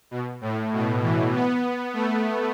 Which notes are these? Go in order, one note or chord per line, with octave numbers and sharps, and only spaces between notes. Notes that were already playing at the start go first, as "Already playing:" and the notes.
B2
A2
B2
E3
B3
A3